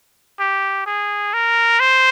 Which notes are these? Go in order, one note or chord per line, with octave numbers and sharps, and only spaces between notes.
G4
G#4
A#4
C5